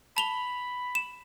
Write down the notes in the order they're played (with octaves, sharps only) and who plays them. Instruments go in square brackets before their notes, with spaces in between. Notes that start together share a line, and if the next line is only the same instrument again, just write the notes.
[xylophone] A5 F7 G7 [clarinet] B5
[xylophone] E7